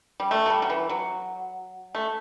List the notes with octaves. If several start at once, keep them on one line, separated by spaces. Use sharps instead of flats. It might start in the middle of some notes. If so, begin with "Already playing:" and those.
G3
A3
F#3
G3
F#3
E3
F#3
A3